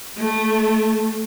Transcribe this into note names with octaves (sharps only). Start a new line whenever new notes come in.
A3